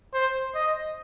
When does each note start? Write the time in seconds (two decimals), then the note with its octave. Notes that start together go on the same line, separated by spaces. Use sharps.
0.14 C5
0.55 D#5